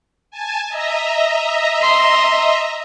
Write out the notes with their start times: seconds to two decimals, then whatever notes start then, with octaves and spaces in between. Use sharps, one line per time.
0.31 G#5 A5
0.69 D#5 E5 A#5
1.82 C6